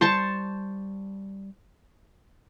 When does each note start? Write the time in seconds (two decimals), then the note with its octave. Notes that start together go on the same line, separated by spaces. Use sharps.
0.01 G3 C5 A5 C6 C#6